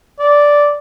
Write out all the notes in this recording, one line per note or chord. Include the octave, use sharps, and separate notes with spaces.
D5